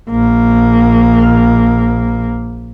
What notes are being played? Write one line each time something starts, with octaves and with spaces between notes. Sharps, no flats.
A#1 A#3